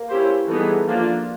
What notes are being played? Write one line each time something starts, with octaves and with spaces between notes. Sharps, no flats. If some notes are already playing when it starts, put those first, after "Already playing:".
Already playing: A#3
C#4 E4 G4 C5
E3 G3 A3 B3 D#4 G#4
F3 A#3 D4 F4